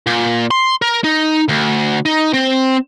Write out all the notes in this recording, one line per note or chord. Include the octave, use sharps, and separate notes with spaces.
A#2
C6
A#4
D#4
D2
D#4
C4